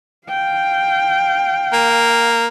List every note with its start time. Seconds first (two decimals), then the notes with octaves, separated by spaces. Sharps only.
0.28 F5 G5
1.73 A#3